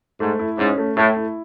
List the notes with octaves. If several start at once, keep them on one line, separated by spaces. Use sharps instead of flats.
G#2 A3
E4
G#2 C#4
A3
A2 A3
E4